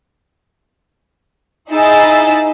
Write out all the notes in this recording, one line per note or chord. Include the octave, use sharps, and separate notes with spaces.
D#4 E4 G#4 E6 A6